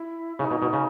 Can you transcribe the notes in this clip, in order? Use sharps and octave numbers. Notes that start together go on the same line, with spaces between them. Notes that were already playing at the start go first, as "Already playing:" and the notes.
Already playing: E4
C#3 D#4
B2
B2
C#3